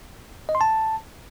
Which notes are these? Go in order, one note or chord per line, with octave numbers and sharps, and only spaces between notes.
D#5
C6
A5